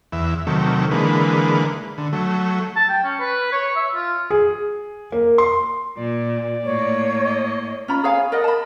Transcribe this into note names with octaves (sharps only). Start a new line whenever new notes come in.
E2 E5
C3 D#3 F#3 A3
D3 E3 G#3 A#3 B4
D3
F#3 A3
A5
G5
C#4
B4
C#5
E5
F4
G#4
A#3
C6
A#2 D5
A2 A#3 C#5
D#5
C#4 F4 A#5 B5
G#4 C#5 F5 G#5
A#4 D5 D#5 F#5
A5 B5